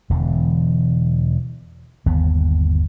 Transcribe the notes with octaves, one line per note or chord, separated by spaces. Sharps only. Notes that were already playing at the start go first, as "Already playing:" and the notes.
E1 E2 D3
G1 D#2 B3